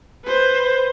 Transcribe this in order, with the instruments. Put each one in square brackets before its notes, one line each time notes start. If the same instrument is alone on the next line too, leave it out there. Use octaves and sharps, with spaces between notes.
[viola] B4 C5